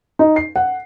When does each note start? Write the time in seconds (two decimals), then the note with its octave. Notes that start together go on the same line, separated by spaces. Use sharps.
0.19 D#4
0.36 C7
0.56 F#5